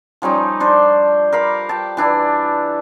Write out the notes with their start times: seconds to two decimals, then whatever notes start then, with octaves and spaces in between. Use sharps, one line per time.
0.22 F3 G3 C#4 D#4
0.60 D4 C5 D5
1.33 A#4 F5 B5
1.69 G5 A5
1.97 E3 D4 E4